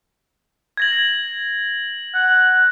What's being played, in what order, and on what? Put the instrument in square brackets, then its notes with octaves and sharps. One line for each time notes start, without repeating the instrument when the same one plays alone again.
[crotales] G#6 A#6 F#7
[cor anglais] F#5